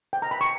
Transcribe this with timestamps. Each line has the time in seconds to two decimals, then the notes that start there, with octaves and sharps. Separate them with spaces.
0.13 G5
0.22 A#5
0.31 B5
0.41 C#6